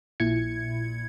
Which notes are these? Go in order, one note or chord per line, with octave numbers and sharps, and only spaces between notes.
A#1 A#2 E4 G#6 C#7